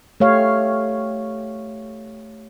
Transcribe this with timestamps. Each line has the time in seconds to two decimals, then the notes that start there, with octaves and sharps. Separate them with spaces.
0.20 A3 G4 C#5 F5